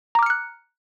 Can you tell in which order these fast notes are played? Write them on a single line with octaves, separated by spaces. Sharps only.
A#5 D6 F6 C#7 F#6